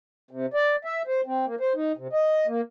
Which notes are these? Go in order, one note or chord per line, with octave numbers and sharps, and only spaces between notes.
C3
D5
E5
C5
C4
A#3
C5
D#4
C3
D#5
A#3